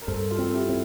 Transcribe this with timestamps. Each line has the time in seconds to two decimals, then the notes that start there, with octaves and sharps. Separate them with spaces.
0.01 A#4
0.07 G2 A4 C5
0.30 F4 A4
0.39 C4
0.49 A4
0.53 E4 G4
0.69 C4